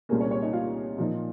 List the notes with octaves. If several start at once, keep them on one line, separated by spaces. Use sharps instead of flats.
C2 A#2 G#3 A#3 C#4 A#4
C#4 C#5
C#4 C#5
D#4 D#5
F4 F5
A#2 F3 A#3 D#4